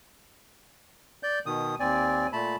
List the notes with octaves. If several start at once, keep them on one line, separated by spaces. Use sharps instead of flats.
D5 G6
B2 D#3 D#6
D#2 C4 D5 G#5
A#2 A3 A5 B5